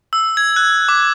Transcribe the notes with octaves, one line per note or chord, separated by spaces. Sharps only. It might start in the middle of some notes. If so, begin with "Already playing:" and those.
E6
G#6
F#6
D6